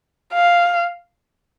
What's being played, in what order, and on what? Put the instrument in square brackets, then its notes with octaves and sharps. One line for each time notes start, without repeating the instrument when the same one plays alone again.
[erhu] F5